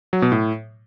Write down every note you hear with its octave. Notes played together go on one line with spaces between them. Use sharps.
F#3
B2
A2